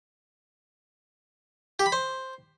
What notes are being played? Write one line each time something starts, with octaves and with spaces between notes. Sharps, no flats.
G4
B5
C5